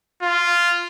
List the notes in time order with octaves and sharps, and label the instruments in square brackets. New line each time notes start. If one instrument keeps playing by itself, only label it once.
[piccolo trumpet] F4